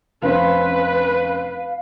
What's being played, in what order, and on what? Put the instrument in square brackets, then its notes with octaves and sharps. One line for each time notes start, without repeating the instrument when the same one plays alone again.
[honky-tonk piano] F1 C#4 C5 [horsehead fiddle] B4 [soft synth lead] F5